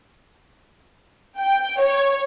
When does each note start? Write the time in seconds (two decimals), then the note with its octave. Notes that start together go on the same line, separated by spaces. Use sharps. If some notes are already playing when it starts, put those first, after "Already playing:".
1.39 G5
1.81 C#5